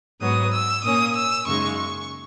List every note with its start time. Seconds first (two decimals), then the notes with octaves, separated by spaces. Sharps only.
0.21 G#2 F#3 B3 D#6
0.52 E6
0.83 A#2 A#3 C#4 D#6
1.14 E6
1.46 F#2 C#3 G#3 D#4 C#6
1.76 C#6